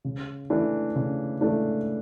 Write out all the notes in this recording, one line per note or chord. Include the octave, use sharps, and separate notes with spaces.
C#3
E3 A3 D4
C#3
E3 A3 D4